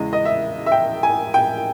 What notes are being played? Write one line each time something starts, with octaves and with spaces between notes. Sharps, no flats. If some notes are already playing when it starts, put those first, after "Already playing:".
Already playing: E2 C#3 G#3 D#5
D#5
E5
E5
G5
G#5
G5